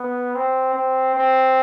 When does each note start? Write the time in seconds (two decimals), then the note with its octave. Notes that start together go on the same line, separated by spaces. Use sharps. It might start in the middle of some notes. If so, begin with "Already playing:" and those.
Already playing: B3
0.35 C4
0.75 C4
1.15 C4